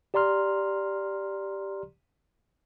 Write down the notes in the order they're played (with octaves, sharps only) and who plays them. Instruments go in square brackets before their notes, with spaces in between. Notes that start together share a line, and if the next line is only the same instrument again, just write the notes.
[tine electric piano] G4 D5 A#5 C6 F6